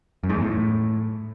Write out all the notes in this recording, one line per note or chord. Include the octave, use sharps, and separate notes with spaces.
F#2
G#2
E2
A2